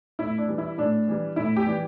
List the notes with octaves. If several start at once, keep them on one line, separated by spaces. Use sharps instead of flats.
A2 E4
D4
E3 G3
E4
A2 D4
E3 G3
A2 E4
G4
E3 G3